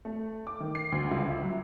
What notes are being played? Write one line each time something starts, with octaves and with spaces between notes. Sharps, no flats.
A3
D6
D#3
C7
D2
C#2
E5
F#3